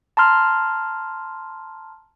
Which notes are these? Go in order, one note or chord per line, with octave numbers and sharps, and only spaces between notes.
A5 A#5 C6 F6